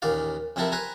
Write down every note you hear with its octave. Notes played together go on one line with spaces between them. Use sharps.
A1 D#2 A#2 D5 F5
F2 C3 C4 E4 A4 A#4
B4 C5 G#5 A#5